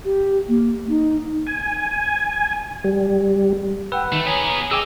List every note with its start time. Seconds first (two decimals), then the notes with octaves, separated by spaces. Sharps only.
0.05 G4
0.48 A#3
0.89 D#4
1.47 G#5
2.84 G3
3.92 B4 F#5 G5 E6
4.12 D#3 A3
4.26 B3 G#4 C#5 G#5 A#5
4.71 D#4 G#4 G5 G#5 D6 E6